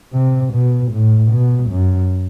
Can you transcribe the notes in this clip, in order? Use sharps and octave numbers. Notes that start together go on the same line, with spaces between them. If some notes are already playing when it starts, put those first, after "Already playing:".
C3
B2
A2
B2
F#2